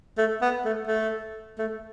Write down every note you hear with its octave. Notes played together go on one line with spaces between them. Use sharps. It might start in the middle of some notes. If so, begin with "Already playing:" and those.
A3
B3
A3
A3
A3